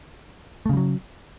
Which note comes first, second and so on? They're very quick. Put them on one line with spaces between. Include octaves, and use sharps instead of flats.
A3 C#3 G3 F#3